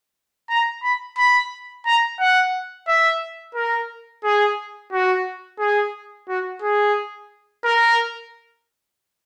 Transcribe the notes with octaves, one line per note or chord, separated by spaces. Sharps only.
A#5
B5
B5
A#5
F#5
E5
A#4
G#4
F#4
G#4
F#4
G#4
A#4